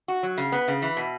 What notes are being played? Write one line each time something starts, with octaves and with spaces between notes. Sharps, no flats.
F#4
F#3
C#3
B3
C#3
E3
B2